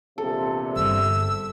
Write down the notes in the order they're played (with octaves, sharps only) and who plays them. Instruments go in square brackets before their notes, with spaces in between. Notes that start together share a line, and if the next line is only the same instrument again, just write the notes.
[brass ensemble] A#1 E2 C3 [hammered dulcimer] A4
[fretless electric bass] G1 [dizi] E6